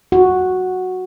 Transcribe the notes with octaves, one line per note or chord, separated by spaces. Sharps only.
F#4